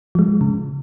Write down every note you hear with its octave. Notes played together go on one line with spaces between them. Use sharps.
F3 G#3
C#3